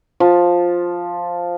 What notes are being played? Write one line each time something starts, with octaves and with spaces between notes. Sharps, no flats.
F3